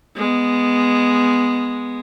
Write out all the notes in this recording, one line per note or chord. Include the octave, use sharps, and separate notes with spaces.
G#3 B3